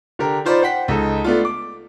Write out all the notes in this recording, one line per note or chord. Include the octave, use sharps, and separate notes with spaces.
D3 G4 A#4
D#4 F4 C5 D5 B5
C5 F#5 G5 B6
C#2 D#4 A4
A3 B3 D4 F4
D6